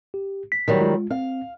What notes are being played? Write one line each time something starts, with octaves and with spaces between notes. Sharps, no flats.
G4
B6
D#3 F#3 G3
G#3 F4
C4 F5